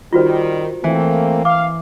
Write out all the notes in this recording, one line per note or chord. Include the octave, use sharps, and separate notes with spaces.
D#3 G3 F4 F#4 C5
E3 A3 A#3 C4
F5 D6